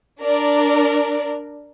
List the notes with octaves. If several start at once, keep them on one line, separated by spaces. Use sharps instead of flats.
D4 A#4 D5